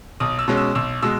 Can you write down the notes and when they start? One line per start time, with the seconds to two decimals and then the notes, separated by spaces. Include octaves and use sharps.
0.20 B1 D#6
0.39 E6
0.48 B2 G#3 C#4
0.57 E6
0.75 B1 E6
1.02 B2 G#3 E6